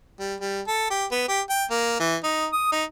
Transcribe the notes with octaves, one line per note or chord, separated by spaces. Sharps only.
G3
G3
A4
G4
B3
G4
G5
A#3
E3
D#4
D#6
D#4